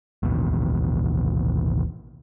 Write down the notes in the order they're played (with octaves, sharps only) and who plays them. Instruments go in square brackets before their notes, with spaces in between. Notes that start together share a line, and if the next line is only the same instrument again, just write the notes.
[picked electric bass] A1 D#2 B2